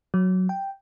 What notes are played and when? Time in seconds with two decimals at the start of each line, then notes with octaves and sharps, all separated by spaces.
0.14 F#3
0.49 G5